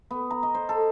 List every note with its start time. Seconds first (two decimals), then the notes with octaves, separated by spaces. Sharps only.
0.11 B3
0.31 A#5
0.43 D#5
0.54 C5
0.69 A4